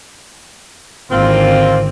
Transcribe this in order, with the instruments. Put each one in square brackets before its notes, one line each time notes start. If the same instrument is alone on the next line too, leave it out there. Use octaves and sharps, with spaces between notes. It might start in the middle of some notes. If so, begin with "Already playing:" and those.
[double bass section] G#1 D3 [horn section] A#3 C4 F4